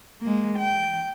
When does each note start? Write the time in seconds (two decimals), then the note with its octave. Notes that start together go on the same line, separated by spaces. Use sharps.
0.22 G#3 A#3
0.58 G5